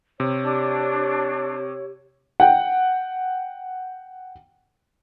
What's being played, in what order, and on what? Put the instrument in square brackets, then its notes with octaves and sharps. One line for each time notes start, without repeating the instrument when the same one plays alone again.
[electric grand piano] C3 [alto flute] C#5
[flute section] D4 [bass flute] G4
[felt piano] F#5 G5